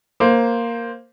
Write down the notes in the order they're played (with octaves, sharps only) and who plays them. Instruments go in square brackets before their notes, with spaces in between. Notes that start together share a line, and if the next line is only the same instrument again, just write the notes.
[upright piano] A#3 C5